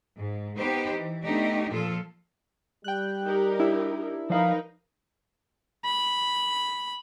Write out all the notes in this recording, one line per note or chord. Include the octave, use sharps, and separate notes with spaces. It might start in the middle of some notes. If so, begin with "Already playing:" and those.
G#2
B3 D#4 G4 B4 C5
E3
A3 B3 D4 D#4 G4
A#2 F3 F4 A4
G3 G5 F#6
D#4 G4 A#4
D4 E4
F3 D#4 A#4 B4 D5 F5
B5